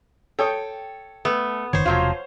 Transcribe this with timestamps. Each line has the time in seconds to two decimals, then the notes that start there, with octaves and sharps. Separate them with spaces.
0.39 A4 C#5 G5 D#6
1.25 A3 B3
1.73 F#1 D#3 C5 C#5
1.86 E1 C3 F3 F#3 F4 F5